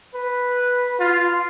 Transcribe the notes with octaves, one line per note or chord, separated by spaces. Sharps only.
B4
F4